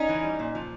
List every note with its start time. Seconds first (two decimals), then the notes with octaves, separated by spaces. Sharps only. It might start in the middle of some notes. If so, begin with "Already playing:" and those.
Already playing: C#4 D#4
0.09 E3
0.23 G3
0.39 A#2
0.55 F3